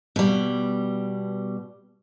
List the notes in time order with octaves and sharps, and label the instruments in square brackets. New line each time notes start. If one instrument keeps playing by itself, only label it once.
[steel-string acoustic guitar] B2 G3